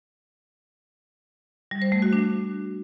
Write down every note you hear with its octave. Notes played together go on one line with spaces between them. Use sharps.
G3
C5
A3
F#4
D4